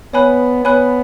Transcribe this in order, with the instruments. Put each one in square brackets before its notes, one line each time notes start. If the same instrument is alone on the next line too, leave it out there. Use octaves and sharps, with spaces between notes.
[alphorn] B3 [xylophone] C#5 G#5 B5 F#6
[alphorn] B3 [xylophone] C#5 G#5 B5 F#6